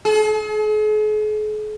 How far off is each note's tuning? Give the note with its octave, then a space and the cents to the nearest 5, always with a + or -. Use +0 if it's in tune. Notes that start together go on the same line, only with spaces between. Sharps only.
G#4 +45